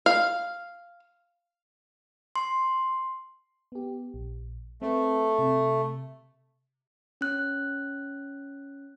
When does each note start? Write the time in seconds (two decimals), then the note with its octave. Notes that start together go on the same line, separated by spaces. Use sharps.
0.06 F5
2.36 C6
3.72 B3 G4
4.14 A#1
4.82 A3 C4 A4 B4
5.39 C3
7.21 C#4 F#6